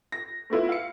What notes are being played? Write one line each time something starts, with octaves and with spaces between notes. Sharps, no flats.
A#6
A3 B3 E4 F4
F5 C#7